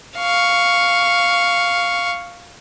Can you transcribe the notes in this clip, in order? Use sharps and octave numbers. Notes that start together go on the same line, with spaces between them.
F5 C#6